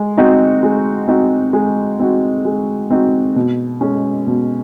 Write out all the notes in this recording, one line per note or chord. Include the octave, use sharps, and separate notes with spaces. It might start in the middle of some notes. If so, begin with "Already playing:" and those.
Already playing: G#3
C4 D#4 F#4
G#3
C4 D#4 F#4
G#3
C4 D#4 F#4
G#3
C4 D#4 F#4
B2
G#3 C#4
B2